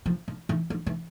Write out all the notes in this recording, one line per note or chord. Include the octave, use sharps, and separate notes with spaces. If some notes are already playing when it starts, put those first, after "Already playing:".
F3
F3
E3
F3
E3